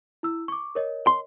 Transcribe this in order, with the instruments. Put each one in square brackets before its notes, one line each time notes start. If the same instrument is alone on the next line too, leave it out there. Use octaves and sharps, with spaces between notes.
[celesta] E4 E6
C#6 D6
A#4 C#5 D#5
[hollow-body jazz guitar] C6